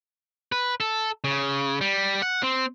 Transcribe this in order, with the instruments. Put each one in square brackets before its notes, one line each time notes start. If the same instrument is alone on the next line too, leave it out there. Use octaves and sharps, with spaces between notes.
[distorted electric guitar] B4
A4
C#3
G3
F#5
C4